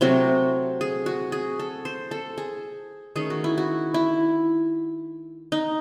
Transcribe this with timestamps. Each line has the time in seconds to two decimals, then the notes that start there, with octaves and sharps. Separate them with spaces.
0.01 C3 F#3 A3 C4 F#4
0.81 G#4
1.06 F#4
1.32 G#4
1.59 A4
1.85 C5
2.11 A4
2.38 G#4
3.16 D#3 A3 C#4 G#4
3.30 F#4
3.44 E4
3.58 F#4
3.94 E4
5.52 D#4